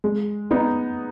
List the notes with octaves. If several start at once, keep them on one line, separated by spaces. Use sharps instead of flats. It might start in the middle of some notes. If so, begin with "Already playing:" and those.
G#3
B3 D#4